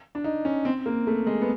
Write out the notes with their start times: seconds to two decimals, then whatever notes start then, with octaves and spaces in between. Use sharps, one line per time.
0.15 D4
0.24 D#4
0.45 C#4
0.65 C4
0.86 A#3
1.07 A3
1.27 G#3
1.41 B3